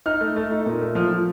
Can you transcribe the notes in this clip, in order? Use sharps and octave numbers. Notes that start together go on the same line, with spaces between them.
D#4 F6
A3
A3
D#4
A#2
A3
F3 F6
F3